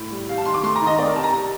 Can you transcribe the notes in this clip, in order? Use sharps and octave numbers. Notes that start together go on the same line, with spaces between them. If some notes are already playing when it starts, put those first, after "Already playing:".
Already playing: A2
G3
C3 F5
A5
D#3 C6
D6
A3 C6
A#5
D#3
D#5
C4 D5
A#4
C3 A5
A#5
C3